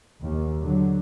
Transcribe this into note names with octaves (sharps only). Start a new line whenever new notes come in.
D#2
D3 F#3